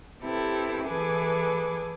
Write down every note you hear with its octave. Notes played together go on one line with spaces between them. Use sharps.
C4 E4 G4 A4 B4
E3 G#4 A4 B4 G#5 D6